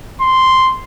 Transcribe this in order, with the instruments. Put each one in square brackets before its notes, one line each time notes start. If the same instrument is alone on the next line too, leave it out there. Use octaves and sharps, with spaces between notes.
[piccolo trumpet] C6